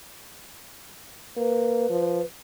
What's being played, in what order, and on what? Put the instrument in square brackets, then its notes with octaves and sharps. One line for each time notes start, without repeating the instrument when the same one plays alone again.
[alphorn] A#3 [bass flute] B4
[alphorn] F3